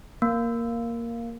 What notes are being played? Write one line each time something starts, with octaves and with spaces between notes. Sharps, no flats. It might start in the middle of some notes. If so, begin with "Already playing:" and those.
A#3